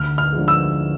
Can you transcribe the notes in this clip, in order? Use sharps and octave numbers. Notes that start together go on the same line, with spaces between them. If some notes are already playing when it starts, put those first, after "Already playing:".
Already playing: D2 F6
F6
D3 F3 G#3
E6